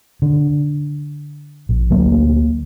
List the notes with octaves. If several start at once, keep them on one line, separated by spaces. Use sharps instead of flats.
D3
A#1
D2 F#3 A#3